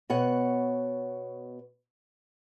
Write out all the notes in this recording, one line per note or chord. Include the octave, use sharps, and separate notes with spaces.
B2 B3 C#5 F#5